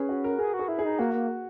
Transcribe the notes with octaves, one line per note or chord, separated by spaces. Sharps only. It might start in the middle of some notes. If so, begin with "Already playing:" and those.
Already playing: C#4 G#4 B4
F#4
A#4
G#4 A#4
F#4
G#4
E4
G#4
D#4
A#3 F#4
A#3